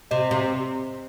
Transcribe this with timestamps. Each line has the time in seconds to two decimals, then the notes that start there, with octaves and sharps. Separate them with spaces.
0.11 C3 D#5
0.31 C3